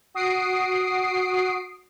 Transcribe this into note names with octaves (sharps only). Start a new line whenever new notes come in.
F#4 D#6 C7 D7